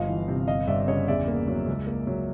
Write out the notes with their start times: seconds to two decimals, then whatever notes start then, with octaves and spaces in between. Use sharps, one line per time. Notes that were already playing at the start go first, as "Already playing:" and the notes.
Already playing: G1 F3 D#5 F5
0.08 E3
0.28 C3
0.48 G1 D#5 F5
0.67 G1 D5 E5
0.88 C#3 C#5 D#5
1.08 E2 D5 E5
1.28 A#3
1.48 F#3
1.67 C#2
1.87 A#3
2.07 F#3